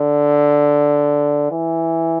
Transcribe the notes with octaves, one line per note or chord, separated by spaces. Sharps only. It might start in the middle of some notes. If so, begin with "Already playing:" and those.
Already playing: D3
E3